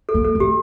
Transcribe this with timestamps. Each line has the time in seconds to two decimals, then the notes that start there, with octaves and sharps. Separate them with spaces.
0.09 A4
0.14 A#3
0.25 A4
0.35 A3
0.40 G4